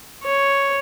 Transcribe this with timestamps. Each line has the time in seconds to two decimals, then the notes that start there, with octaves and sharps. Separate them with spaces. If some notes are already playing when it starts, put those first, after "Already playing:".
0.23 C#5